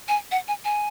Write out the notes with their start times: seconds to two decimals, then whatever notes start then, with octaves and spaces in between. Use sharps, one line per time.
0.08 G#5
0.31 F#5
0.48 G#5
0.65 G#5